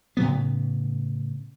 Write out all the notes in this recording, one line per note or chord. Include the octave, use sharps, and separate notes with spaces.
A2 C#3 F#3 B3